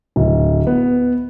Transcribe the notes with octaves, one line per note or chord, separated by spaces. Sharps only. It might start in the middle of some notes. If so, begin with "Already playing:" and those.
D1
B3